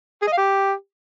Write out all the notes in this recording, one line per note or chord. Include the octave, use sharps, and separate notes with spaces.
G#4
D#5
F5
G4